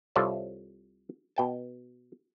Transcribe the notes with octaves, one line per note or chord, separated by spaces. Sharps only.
C2 C3 F4 A4 C#5 A5
B2 G5 A5